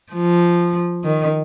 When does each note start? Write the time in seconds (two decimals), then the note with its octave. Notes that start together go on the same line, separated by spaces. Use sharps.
0.13 F3
1.04 D#3